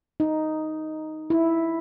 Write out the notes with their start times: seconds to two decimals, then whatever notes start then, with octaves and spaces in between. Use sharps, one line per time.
0.20 D#4
1.30 E4